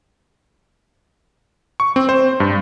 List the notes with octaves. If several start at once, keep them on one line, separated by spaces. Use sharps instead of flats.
C#6
C4
C5
G2